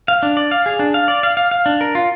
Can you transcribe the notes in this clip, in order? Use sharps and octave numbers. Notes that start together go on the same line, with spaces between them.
F5
D4
D5
F5
G#4
D4
F5
D5
F5
F5
F5
D4
A#4
F4